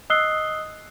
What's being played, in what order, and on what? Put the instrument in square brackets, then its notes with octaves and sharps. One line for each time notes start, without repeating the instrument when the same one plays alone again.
[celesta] D#5 D#6 E6 F#6 C7 G7